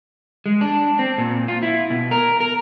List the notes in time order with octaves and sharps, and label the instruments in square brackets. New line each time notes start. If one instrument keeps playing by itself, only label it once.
[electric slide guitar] G#3
D4
C4
A#2
F4
E4
B2
A#4
A#4